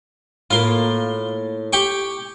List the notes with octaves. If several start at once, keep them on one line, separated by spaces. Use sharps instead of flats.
A2 A#3 F4 C6
G4 G5 C#6